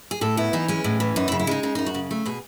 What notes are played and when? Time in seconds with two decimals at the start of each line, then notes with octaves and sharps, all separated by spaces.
0.11 G#4
0.21 A2 A4
0.37 B3 E4
0.53 E3 D#4
0.68 G#3 C#4
0.84 A2
1.00 E3
1.16 F#2 D#4
1.28 E4
1.32 C#3
1.39 E4
1.47 G#3 D#4
1.63 C#3 D#4
1.75 F#2 D#4
1.86 F#4
1.94 C#3
2.11 A3
2.26 B2 G#4